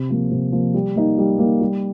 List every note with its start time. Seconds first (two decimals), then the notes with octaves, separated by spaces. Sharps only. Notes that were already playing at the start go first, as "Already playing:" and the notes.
Already playing: C3
0.09 F3 A#3
0.31 C3
0.52 F3 A#3
0.74 G3
0.96 A#3 D#4
1.18 G3
1.39 A#3 D#4
1.61 G3